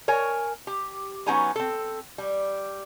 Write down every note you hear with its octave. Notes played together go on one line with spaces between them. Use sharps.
A#4 C#5 G#5
G4
F#3 B3 C#4 D#4 G#5 A#5
C4 A4
G3